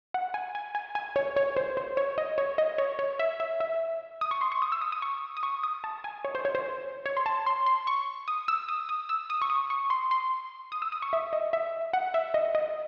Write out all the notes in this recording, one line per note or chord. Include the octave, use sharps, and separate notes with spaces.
F#5
G#5
G#5
G#5
G#5
C#5
C#5
C5
C5
C#5
D#5
C#5
D#5
C#5
C#5
E5
E5
E5
D#6
C#6
C6
C#6
D#6
E6
D#6
D#6
C#6
D#6
C#6
D#6
A5
G#5
C#5
C5
C#5
C5
C#5
C6
A5
C6
C6
C#6
D#6
E6
D#6
D#6
E6
D#6
C#6
D#6
C#6
C6
C6
D#6
E6
D#6
C#6
E5
D#5
E5
F#5
E5
D#5
D#5